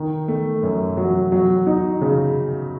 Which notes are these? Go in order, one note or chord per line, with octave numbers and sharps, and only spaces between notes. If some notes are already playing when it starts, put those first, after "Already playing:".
Already playing: D#3
A3
F#2
F#3
F#3
D#4
C#3